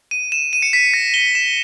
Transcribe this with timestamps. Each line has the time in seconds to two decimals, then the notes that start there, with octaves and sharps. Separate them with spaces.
0.11 D#7
0.32 E7
0.53 D#7
0.62 C#7
0.73 B6
0.94 A#6
1.14 G7
1.35 E7